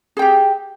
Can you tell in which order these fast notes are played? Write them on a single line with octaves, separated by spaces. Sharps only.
G#4 G5 G4